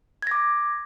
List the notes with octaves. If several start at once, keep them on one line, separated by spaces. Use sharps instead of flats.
D6 G#6 A#6